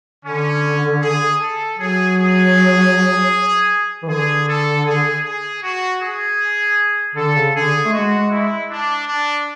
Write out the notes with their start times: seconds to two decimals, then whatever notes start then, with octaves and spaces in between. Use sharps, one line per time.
0.25 D3 C#4
1.02 G#4
1.40 A4
1.78 F#3 G#4
2.17 G#4
4.03 E3
4.09 D3 G#4
4.47 A4
4.85 G#4
5.24 G#4
5.62 F#4
6.01 G#4
7.15 D3 A4
7.35 C#3
7.54 D3 G#4
7.85 A3
7.93 G#3 F#4
8.30 E4
8.70 D4
9.07 D4